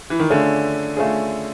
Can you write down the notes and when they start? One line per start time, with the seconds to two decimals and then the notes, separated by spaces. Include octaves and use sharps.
0.10 E3
0.20 D#3
0.30 D3 A3 C#4 F4 G#4
0.97 A3 C#4 F4 G#4